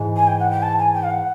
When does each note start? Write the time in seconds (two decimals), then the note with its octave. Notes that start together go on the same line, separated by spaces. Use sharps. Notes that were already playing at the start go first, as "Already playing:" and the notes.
Already playing: G#2 E3 G#3
0.16 G#5
0.27 G5
0.40 F#5
0.51 G5
0.63 A5
0.79 G#5
0.94 G5
1.03 F5
1.10 F#5